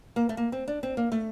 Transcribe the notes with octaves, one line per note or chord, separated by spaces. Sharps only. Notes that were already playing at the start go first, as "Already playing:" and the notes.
A#3
A3
A#3
C4
D4
C4
A#3
A3